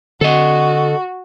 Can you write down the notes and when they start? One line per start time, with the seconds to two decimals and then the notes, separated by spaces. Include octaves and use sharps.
0.21 D3 F#4 A4 D#5